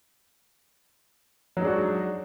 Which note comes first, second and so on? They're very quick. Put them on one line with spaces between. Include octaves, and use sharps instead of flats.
F#3 D#4 G#3 D4 F#4